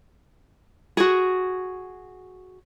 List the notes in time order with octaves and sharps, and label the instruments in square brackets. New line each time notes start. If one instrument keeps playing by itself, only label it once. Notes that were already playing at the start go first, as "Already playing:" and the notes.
[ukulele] F#4 G#4